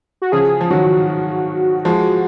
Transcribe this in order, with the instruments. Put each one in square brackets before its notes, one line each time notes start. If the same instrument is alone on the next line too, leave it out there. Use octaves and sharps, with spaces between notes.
[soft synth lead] F#4
[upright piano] C#3 F3 [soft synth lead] G#4
[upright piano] F3
[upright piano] D#3 F#3 [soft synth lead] F#4
[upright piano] F3 G#3